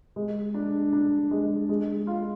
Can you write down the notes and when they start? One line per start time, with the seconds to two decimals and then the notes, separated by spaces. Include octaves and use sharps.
0.16 G#3
0.54 D4
0.93 D4
1.31 G#3
1.69 G#3
2.07 F4